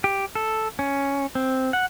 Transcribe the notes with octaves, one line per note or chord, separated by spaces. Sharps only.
G4
A4
C#4
C4
F#5